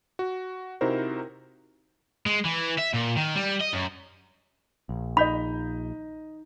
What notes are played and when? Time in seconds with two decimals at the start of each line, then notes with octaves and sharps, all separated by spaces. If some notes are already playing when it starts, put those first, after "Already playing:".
0.19 F#4
0.81 C3 D#4 E4 F#4 A#4 C5
2.26 G#3
2.45 E3
2.78 E5
2.94 A#2
3.16 D#3
3.36 G3
3.60 D#5
3.73 F#2
4.89 A#1
5.17 D#4 D#5 B5 G6 B6